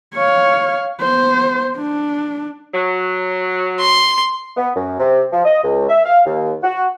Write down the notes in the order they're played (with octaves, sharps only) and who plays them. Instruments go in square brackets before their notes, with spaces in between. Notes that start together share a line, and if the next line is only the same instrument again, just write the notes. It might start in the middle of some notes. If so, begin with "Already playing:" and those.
[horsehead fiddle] C#5 F5
B3 C5
D4
[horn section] F#3
[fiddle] C6
[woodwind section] B3
F#2
C3
F3
D#5
C#2
E5
F5
D#2
F#4